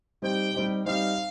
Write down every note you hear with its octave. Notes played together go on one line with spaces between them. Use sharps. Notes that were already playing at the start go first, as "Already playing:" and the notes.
G3 C4 D#4 G4 G5
G3 C4 D#4 G4
G3 C4 D#4 G4 F5